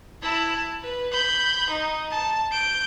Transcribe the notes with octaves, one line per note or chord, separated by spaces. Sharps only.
E4 A5
B4
B5 G6
D#4
A5
G6 D7